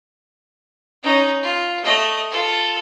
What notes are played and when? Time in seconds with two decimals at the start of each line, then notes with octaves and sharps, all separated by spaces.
1.03 C#4 D#4
1.43 F4
1.83 A3 D#5
2.31 F4 A4